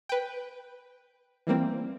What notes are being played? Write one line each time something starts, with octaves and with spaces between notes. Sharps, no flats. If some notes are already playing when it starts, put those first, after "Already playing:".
B4 G5
E3 G3 A#3 C4